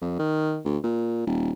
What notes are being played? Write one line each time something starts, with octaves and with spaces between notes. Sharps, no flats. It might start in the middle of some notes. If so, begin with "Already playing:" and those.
F2
D#3
D2
A#2
D#1